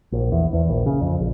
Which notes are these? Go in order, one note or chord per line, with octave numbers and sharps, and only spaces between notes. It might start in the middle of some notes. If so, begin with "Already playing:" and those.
A#1
E2
E2
A#1
C#3
F2
A#1